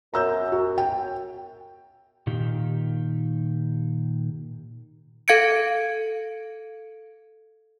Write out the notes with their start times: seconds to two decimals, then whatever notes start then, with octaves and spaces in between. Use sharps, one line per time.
0.14 F#2 A#5 E6 G6
0.52 F#4
0.78 G5
2.27 A#2 D#3 G4
5.28 A4 F5 G#6 C#7 D7